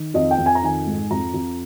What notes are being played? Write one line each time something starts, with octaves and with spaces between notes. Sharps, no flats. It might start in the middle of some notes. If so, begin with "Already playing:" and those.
Already playing: D#3
F2 D#5
G5
F2
G#5
A#5
D#3 G#5
G#2
F2 A#5
F2